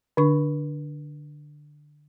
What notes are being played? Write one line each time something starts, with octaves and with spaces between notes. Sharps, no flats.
D3 D4 C#6